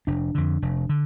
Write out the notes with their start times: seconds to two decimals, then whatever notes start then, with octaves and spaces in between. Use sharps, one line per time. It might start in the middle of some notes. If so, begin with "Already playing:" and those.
0.07 F1 D4
0.35 F2 D3
0.62 F1
0.89 D3